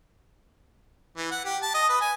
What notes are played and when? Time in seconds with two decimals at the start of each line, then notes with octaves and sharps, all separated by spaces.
1.17 E3
1.31 F#5
1.45 G4
1.62 A5
1.74 D#5
1.89 B4
2.01 G#5